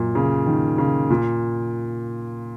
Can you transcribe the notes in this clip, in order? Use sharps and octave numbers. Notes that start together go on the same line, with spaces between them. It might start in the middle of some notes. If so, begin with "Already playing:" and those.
Already playing: F#2 A#2
C#3
D#3
C#3
A#2